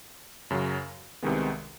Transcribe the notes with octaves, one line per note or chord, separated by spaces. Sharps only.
F#2 C#3 F#3
C2 C3 D#3 G#3 B3